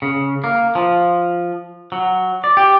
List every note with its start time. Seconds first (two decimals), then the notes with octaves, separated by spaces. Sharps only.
0.02 C#3
0.44 A#3
0.75 F3
1.92 F#3
2.44 D5
2.57 G4